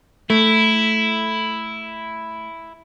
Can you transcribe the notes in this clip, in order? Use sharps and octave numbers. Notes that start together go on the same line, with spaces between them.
A3 E4